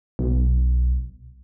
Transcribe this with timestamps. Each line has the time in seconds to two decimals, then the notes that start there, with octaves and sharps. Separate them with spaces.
0.19 B1